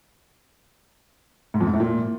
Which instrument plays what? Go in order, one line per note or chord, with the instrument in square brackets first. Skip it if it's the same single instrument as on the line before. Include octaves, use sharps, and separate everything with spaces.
[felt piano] G#2
F2
G#2
A2
A#2